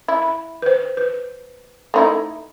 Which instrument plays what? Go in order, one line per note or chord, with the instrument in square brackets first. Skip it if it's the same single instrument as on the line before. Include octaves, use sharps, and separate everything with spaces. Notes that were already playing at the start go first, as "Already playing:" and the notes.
[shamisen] E4
[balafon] B5
B4 C5
B4
[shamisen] A3 D#4 E4